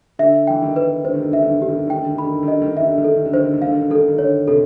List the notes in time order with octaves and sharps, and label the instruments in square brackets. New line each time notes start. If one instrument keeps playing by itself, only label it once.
[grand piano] D3 [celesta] E5
[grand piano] E3 [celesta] G5
[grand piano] D#3
[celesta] B4
[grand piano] D3 [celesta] C5
[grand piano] D#3
D3
[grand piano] D#3 [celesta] E5
[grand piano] D3
D#3
[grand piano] D3 [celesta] G4
[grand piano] D#3
D3
[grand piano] D#3 [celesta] G5
[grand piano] D3
D#3
[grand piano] D3 [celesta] B5
[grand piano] D#3
D3
D#3
[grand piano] D3 [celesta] D#5
[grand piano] D#3
D3
[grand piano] D#3 [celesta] E5
[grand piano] D3
D#3
[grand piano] D3 [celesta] A4
[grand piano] D#3
D3
[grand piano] D#3 [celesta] C5
[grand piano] D3
D#3
[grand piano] D3 [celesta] F5
[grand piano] D#3
D3
[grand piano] D#3 [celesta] A4
[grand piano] D3
D#3
[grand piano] D3 [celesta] C#5
[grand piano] C3 [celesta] A4